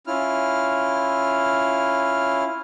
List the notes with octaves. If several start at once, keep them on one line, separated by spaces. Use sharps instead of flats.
C#4 E4 F4 F6